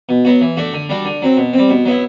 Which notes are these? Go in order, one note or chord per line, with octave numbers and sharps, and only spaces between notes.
B2
F#3 B3 F#4
E3
A3 D4 F#4
D3
G3 D4 F#4
D3
F#3 C4
B2
G3 C4
B2
F#3 B3 E4